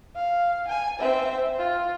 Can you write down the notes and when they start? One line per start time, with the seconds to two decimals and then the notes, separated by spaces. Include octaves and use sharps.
0.16 F5
0.68 G#5
0.99 C4 E5
1.58 F4